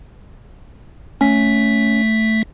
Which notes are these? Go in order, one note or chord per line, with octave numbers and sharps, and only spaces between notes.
A3 C#4 B6